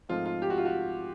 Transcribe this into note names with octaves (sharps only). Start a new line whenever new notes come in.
G#2 F3 A3 C4 F4
F4
G4
F#4
F4
F#4